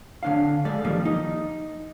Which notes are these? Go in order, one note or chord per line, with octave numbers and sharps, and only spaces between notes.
D3 D4 F5
G#3 A4 D5
D#3 F3 G3 A#3
D#4